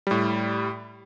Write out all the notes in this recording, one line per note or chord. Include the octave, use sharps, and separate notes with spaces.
A2 G3